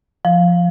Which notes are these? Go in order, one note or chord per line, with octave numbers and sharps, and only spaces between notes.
F3